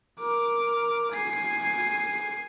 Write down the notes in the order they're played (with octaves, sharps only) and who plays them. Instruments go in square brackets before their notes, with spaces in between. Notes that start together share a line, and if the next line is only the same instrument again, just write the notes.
[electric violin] A#4 D6
G#5 C7